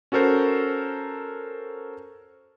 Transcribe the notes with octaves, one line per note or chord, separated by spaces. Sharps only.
C#4 F#4 A4 A#4 C5